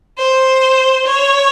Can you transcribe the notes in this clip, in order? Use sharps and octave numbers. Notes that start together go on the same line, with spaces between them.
C5
C#5